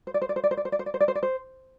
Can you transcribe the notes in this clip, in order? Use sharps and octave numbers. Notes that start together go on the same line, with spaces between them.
C5
D5
C5
D5
C5
D5
C5
D5
C5
D5
C5
D5
C5
D5
C5
D5
C5